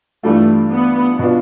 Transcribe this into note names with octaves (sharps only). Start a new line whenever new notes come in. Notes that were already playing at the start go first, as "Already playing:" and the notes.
G2 E3 G3 A3 D4 F4
B3
B2 B3 D4 F4